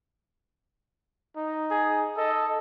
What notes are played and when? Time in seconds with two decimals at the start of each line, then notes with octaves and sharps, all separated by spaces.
1.37 D#4
1.71 G#4
2.17 A4 D#5